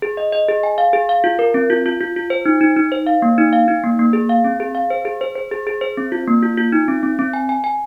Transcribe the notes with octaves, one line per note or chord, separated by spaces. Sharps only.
G#4
D#5
D#5
G#4
G#5
F5
G#4
F5
F4
A#4
C4
F4
F4
F4
F4
C5
D#4
D#4
D#4
C5
F5
A#3
D#4
F5
D#4
A#3
A#3
G#4
F5
C4
G#4
F5
C5
G#4
C5
C5
G#4
G#4
C5
C4
F4
A#3
F4
F4
D#4
C4
C4
C4
G#5
G#5
G#5